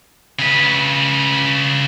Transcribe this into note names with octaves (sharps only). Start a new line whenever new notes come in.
C#3 B4